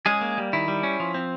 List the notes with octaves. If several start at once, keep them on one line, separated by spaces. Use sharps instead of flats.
G#3 C#4 G#4
A#3
G3
D#3 E4
G3
C#4
F3
C4